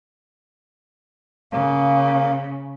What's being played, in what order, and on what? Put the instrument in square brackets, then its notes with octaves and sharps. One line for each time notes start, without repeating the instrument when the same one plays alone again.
[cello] C#3 [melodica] A#3